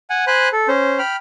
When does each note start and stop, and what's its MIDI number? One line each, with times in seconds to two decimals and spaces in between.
0.10 0.25 78
0.10 0.25 80
0.27 0.49 72
0.27 0.49 80
0.27 0.49 83
0.27 0.49 90
0.53 0.68 69
0.68 0.99 61
0.68 0.99 72
0.99 1.16 79
0.99 1.16 83
0.99 1.16 89